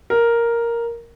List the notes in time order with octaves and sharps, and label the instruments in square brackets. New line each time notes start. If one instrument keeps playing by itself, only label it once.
[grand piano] A#4